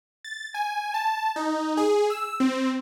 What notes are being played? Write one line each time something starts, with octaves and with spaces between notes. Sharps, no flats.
A6
G#5
A5
D#4
G#4
E6
C4